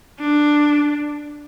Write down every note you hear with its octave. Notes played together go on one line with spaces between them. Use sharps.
D4